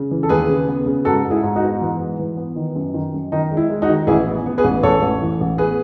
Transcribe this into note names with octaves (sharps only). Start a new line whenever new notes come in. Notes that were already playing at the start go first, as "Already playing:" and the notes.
Already playing: C#3
E3
A4
D#2 G#4 B4
C#3
B3
C#3
G#2 F#4 A4
G#2
E4 G#4
G#2
D#4 F#4
B3
E3
G#2
E3
B3
D#3
F#2
D#3
F#2
D#3 D#4
G#3
E4
G#3
D#4 F#4
D#3
A1 E4 G#4
B3
B3
G#4 B4
A1
A1 A4 C#5
A1
E3
A1
B3 G#4 B4